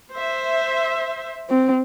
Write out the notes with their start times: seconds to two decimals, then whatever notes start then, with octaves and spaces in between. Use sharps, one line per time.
0.12 C5 E5
1.50 C4